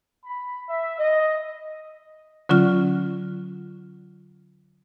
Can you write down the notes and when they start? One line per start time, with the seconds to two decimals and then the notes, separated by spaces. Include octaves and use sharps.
0.25 B5
0.69 E5
0.99 D#5
2.49 D3 F#3 C#4 F4 F6